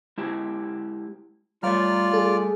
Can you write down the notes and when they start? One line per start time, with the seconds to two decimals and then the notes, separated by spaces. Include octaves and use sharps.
0.18 G#3 E4 G4
1.63 G3 A3 F4 C#5 D5 F5 A#5 F6
2.14 G#4 A4